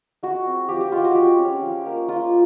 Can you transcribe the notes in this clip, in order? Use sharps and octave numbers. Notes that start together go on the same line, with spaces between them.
G#3 F#4
C4
F3 G4
G4
G#3 F4
F#4
G#3 G4
C#4
F3
A#3
G#3 F4